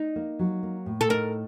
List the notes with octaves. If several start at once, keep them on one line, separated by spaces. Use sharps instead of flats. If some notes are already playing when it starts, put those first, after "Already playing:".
Already playing: D#4
A#3
F#3
A#3
A2
A4
D#4 A#4